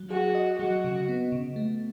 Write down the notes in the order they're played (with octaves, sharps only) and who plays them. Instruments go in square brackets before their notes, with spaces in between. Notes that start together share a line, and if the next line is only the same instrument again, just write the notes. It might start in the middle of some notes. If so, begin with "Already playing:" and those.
Already playing: [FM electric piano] F#3
[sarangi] F#4 [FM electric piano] G#4
[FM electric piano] D#5
[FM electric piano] F#3 [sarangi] F#4
[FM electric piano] C#3
B3
C#3
A3